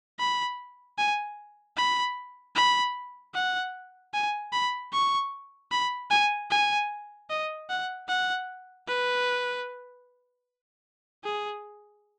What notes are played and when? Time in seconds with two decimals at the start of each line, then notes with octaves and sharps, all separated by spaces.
0.20 B5
0.98 G#5
1.77 B5
2.56 B5
3.35 F#5
4.14 G#5
4.53 B5
4.93 C#6
5.72 B5
6.11 G#5
6.51 G#5
7.30 D#5
7.70 F#5
8.08 F#5
8.88 B4
11.24 G#4